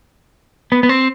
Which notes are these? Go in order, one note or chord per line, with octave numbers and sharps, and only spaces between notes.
B3
B3
C4